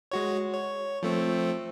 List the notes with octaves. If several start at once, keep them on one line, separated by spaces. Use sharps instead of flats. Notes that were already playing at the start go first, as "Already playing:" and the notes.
G#3 F#4 C#5
C#5
F3 A3 C4